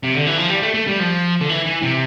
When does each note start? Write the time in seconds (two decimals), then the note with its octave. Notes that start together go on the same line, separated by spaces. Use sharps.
0.03 C3
0.15 D3
0.26 E3
0.38 F3
0.50 G3
0.63 A3
0.74 A3
0.87 G3
0.99 F3
1.41 D3
1.49 E3
1.66 E3
1.83 C3